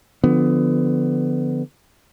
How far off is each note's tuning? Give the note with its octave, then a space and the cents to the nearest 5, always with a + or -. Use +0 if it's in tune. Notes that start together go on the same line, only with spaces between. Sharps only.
D3 +10 F3 +0 B3 +20